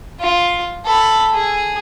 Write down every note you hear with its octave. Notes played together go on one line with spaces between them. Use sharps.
F4
A4 B5
G#4